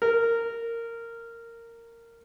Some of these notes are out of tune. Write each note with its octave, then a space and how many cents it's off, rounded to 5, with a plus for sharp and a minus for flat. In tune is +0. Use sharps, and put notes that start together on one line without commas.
A#4 -15